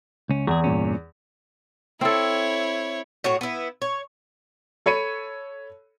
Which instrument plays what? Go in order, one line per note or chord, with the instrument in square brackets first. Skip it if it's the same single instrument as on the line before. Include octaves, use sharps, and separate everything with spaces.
[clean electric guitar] C#2 C#4
[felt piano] E2 [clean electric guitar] F#4 G#4
[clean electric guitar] G2 A#2 C#4
[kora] C4 A4 [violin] E4 C#5
[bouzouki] A2 F#4 C#5
B3 E4
C#5
[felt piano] A4 C#5 B5 C#7 D#7